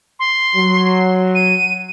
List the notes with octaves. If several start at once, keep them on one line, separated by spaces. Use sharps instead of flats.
C6
F#3
D#7